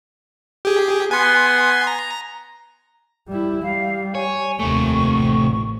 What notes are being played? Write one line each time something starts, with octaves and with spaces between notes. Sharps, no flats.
G4 G#4
B3 G#5 C6
A#5
G3 E4
G3 F5
C#5 G#5
F1 D#2 C3 A3 C#6
A1